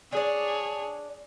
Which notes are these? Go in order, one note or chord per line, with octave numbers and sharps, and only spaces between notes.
D4 G#4 C#5 D5